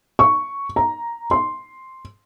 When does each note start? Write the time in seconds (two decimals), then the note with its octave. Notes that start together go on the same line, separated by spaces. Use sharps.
0.19 C#6
0.76 A#5
1.31 C6